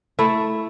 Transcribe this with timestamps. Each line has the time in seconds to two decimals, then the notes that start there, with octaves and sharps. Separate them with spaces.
0.19 A3 E4